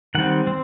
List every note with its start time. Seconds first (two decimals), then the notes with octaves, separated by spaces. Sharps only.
0.15 D#3 G3 C4 F#5
0.47 C4